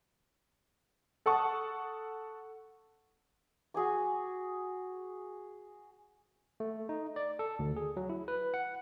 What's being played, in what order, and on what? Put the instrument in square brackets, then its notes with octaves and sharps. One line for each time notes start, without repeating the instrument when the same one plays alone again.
[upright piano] A4 F#5 A5 C#6 D#6
[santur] F#4 G#4 G#5 D6
[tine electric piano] A3
D#4
D5
A4
D2
G#4
F#3
E4
B4
F#5